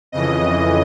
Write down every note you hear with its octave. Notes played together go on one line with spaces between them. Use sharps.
F2 C#3 E3 D#5